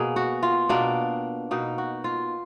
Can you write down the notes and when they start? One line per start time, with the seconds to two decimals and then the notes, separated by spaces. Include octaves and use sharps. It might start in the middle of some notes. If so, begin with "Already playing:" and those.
Already playing: B2 A#3 G#4
0.16 F#4
0.43 F4
0.69 B2 A#3 D4
1.51 B2 A#3 D#4
1.78 F#4
2.04 F4